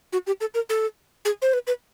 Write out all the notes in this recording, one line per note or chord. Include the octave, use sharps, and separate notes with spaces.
F#4
G4
A4
A#4
A4
G#4
C5
B4
B4